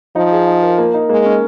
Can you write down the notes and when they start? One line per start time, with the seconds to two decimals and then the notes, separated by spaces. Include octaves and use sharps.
0.16 F3 D#4
0.32 G#4
0.47 D#4
0.63 A#4
0.78 A#3
0.94 D#4
1.09 G#3 A#3
1.25 C#4